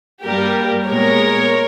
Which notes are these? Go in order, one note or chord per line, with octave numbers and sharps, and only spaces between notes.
G2 G3 A#3 G4 A#4
A#2 G#3 B3 A#4 C#5